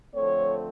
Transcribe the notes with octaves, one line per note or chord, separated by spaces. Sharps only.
D3 F3 A3 C4 C#5